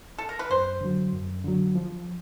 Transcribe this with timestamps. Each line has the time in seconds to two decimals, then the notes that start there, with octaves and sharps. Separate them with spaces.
0.18 A4
0.29 A#4
0.39 B4
0.50 F#2 C5
0.81 D3 F#3
1.12 F#2
1.44 D3 F#3
1.75 F3